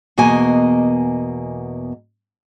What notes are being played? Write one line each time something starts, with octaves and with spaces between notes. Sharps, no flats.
E2 B2 A#3 D#5 G#5